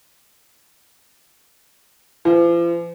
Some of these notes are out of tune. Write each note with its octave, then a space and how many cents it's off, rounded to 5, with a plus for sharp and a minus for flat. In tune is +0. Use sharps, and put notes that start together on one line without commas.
F3 -45